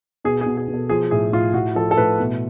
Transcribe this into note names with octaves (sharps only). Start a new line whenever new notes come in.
B2 G#4
B2 G#4
G#4
B2
A4
F3 G#4
A2 G#4
A2 F4
A2 F#4
F3 A4
A4
A2 B4
B2